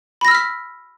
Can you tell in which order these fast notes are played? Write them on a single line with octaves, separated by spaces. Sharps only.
B5 A#6 E6 F6 B6